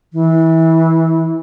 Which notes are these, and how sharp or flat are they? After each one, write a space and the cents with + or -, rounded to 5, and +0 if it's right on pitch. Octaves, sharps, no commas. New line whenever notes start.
E3 -25